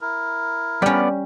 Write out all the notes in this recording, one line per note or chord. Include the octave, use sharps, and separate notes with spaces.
E4 A#4
G3 B3 C#4 D5